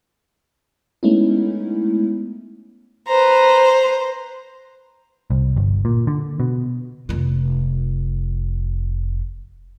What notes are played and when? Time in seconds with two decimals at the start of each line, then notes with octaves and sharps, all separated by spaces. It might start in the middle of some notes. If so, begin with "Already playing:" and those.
1.03 G#3 A3 B3 C#4 D#4 E4
3.08 B4 C5 A#5
5.30 C2
5.57 G1
5.85 A#2
6.07 D3
6.40 B2
7.09 F1 F4